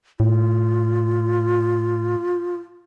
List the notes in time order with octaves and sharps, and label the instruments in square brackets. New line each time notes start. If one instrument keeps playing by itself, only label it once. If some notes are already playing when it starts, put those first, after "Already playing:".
[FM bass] A2 [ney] F4